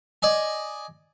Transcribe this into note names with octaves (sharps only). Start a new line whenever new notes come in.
D5 D#5 G#5